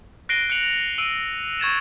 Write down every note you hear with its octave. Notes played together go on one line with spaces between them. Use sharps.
F#6 A#6 C7 D7 D#7 G7
F#6 C#7 D7 F7 F#7
F7
E6 D7 D#7 F#7
C#6 G#6 A6 E7